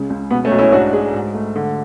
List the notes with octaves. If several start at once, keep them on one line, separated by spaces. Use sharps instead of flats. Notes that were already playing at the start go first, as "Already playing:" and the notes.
Already playing: C#2 C#3
C#2
B2 B3
A3 C#4
B1
C#4 E4
G#2 D4 F#4
G#3
G#2
A3
D3